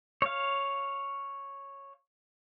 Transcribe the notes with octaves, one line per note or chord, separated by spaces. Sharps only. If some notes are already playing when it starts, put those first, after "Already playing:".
C#5 F5